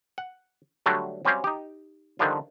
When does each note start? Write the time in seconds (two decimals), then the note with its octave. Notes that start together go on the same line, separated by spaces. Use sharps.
0.18 F#5
0.86 D3 F#3 G3 A3 D4
1.25 F#3 G3 C4 C#4 G4 F5
1.44 D#4 G4
2.19 D3 D#3 F3 G3 D4 F4